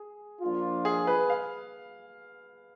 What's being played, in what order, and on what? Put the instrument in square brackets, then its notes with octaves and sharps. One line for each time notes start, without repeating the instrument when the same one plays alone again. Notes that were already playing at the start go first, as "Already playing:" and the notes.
Already playing: [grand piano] G#4
[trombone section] F3 A#3 D4 F4
[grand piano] G#4
B4
F5